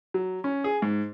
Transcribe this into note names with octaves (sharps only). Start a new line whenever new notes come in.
F#3
C#4
G#4
G#2